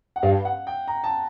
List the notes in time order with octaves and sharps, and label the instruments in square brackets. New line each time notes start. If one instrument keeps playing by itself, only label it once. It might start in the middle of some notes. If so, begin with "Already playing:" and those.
[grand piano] F#5
[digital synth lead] G2 [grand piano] F5
[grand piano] F#5
G5
A#5
A5